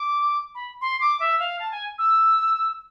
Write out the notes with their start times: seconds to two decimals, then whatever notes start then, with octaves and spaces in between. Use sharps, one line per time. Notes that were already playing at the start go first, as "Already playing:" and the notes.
Already playing: D6
0.55 B5
0.81 C6
1.01 D6
1.20 E5
1.39 F5
1.59 A5
1.71 G#5
1.98 E6